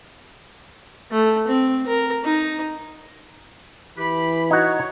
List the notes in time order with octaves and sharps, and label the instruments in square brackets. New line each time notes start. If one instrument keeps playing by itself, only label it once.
[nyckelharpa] A3
C4
A#4
D#4
[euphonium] E3 [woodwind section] G4 B5
[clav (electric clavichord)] D#4 F#4 [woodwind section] C#5